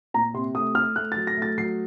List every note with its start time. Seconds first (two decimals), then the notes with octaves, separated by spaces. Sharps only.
0.14 A#2 A#5
0.34 C3 C6
0.55 A3 D#6
0.75 A3 F6
0.96 A3 F#6
1.12 A6
1.16 F#3
1.27 A#6
1.37 A3
1.42 A6
1.58 F#3 C7